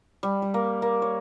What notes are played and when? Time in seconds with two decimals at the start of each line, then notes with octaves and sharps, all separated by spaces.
0.23 G3
0.42 G3
0.54 A#3
0.82 A#3
1.02 C#5